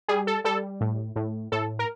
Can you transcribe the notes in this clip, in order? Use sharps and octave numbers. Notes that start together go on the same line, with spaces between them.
G3 G#4
A4
G3 A4
A2
A2
A2 A4
A#4